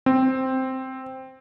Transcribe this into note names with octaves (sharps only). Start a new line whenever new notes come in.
C4